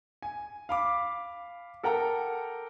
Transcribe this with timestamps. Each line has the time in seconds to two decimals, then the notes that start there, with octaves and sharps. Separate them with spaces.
0.22 G#5
0.69 F5 B5 D6
1.83 A4 A#4 F#5 G5 A#5